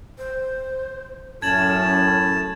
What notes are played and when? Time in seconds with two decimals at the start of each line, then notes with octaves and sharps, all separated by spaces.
0.18 C5
1.42 F#2 A2 C#4 A5 G#6 E7 F#7